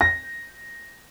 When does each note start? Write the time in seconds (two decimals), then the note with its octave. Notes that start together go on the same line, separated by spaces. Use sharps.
0.01 A#6